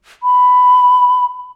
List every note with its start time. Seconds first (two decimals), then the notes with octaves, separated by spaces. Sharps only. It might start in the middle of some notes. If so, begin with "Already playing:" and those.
0.23 B5